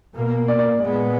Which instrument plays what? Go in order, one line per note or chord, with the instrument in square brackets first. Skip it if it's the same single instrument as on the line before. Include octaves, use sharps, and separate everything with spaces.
[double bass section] B2 A#3
[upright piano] D5
D5
[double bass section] A#2 G#3 B3 [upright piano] D5